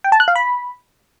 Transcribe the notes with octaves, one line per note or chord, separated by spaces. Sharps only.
G5
A5
F#6
F5
B5